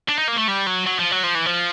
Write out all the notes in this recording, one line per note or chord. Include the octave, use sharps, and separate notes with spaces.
D4
D#4
A#3
A3
G3
F#3
F#3
F3
F#3
F3
E3
F3